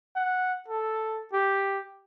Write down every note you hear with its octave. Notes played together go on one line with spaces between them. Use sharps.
F#5
A4
G4